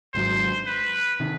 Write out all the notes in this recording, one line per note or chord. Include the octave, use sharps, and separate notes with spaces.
G#1 G#2 D#3 F#3 C5
B4
C3 D#3